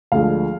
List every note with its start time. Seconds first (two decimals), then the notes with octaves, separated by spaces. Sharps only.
0.12 D2 D3 F3 G#3 F5